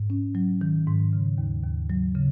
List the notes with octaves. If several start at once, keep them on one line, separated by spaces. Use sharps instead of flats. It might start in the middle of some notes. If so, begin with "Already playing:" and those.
Already playing: G#2
C#4
F#3
D#3
G#2
C#3
D#2
D#2
F#3
C#3